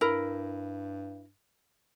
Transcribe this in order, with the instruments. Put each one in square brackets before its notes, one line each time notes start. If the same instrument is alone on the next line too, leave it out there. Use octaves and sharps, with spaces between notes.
[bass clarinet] G2 [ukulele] E4 A#4